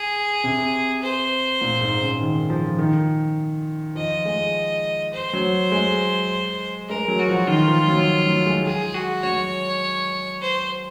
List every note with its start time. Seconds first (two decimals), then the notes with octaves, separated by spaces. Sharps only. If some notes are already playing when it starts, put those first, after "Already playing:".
Already playing: G#4
0.44 C3
1.02 C5
1.61 A#2
1.81 G#2
2.01 C#3
2.20 D#3
2.50 F3
2.79 D#3
3.95 F3 D#5
4.25 G#3
5.13 C5
5.33 F#3
5.72 G#3
6.89 G#3 A#4
7.08 F#3
7.19 F#4
7.29 F3
7.47 D#3 F4
7.68 F3
7.87 F#3
8.26 F#3
8.46 G#3
8.65 G#4
8.94 F#4
9.23 F#3 C#5
10.41 C5